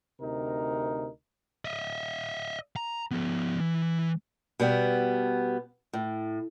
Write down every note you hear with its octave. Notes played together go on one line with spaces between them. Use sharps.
D2 C3 D#4 A#4
D#5 E5
A#5
F3 B3
E3
B2 G3 B3
A2